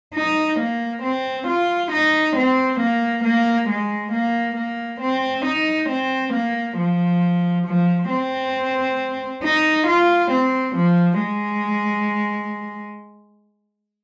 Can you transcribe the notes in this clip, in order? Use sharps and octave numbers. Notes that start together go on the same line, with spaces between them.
D#4
A#3
C4
F4
D#4
C4
A#3
A#3
G#3
A#3
A#3
C4
D#4
C4
A#3
F3
F3
C4
D#4
F4
C4
F3
G#3